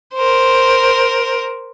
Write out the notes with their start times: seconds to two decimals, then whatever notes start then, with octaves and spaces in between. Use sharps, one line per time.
0.15 A#4 C5